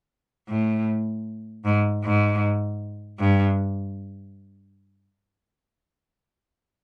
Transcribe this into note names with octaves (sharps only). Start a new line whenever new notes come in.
A2
G#2
G#2
G2